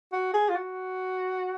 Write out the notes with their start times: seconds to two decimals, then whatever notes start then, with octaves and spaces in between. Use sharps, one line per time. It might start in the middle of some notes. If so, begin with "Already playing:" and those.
0.13 F#4
0.34 G#4
0.49 F4
0.56 F#4